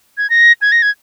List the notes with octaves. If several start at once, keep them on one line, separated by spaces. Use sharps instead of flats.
G#6
A#6
G#6
A#6
G#6